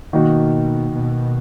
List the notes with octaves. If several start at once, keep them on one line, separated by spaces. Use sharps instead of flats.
B2 D#3 A#3 D#4 F#4
B2